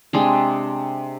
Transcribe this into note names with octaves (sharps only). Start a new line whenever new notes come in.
C3 G#3 C4 D4